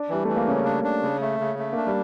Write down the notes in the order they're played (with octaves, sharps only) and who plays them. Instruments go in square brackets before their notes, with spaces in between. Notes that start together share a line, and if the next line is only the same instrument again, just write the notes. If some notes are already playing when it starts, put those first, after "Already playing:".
Already playing: [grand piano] D4
[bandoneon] E3 [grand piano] G3
[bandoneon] E3 [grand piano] A3
[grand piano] A#3
[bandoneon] C#3 [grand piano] C#4
[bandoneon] D4
D4
C#3
A3
C#3
A3
[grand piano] A#3 [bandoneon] D4
[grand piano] G3